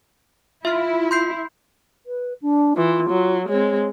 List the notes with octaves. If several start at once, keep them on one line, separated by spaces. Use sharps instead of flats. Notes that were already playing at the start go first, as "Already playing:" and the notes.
E4 F4 E5 F6
C6 G6 C7
B4
D4
E3 F4
F#3
G#3 C4 C#5